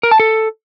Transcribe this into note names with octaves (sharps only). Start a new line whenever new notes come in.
A#4
A5
A4